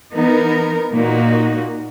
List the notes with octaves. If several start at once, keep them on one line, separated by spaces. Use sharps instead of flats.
E3 B3 D#4 A#4
A#2 A#3 D#4 F#4